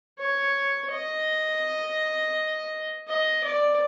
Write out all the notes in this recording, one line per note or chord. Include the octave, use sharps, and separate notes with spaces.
C#5
D#5
D#5
D5